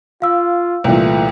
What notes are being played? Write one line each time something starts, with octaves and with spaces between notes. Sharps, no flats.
F4 F5 E6
C2 A#2 E3 A3 F4